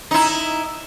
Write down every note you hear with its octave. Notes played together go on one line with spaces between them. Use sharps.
D#4 E4